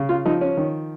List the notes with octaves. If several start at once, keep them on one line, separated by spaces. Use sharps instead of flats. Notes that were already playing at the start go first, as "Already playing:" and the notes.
Already playing: C#3
F4
F3 D#4
C#4
D#3